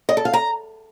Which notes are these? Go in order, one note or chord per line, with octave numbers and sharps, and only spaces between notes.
D#5
A4
F5
A#5